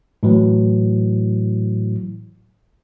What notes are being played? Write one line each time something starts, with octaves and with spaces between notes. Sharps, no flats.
A2 E3 F#3